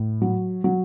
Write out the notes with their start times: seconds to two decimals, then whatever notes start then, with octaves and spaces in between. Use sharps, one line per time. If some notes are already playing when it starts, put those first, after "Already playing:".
Already playing: A2
0.22 F#3
0.64 F#3